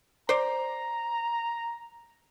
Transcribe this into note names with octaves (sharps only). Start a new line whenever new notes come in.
C5 D5 A#5